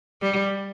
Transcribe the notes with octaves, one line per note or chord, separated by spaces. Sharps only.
G3